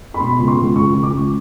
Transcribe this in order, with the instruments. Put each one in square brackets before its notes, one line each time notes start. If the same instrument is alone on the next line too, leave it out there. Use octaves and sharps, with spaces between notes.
[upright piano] B5
B2 C6
C#2
C6
C#2
C#2 C#6
C#2
D6
C#2